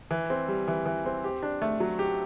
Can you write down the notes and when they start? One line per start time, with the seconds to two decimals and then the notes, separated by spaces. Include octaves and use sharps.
0.11 E3
0.30 C4
0.48 G3
0.68 E3
0.86 E3
1.06 C4
1.24 G4
1.43 D4
1.62 A3
1.80 F#3
1.99 G4